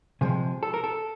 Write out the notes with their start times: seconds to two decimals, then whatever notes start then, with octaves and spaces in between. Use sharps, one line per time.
0.21 C3 F3 G#3 G#4
0.63 A4
0.74 A#4
0.84 A4